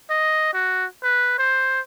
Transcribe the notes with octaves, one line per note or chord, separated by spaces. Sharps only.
D#5
F#4
B4
C5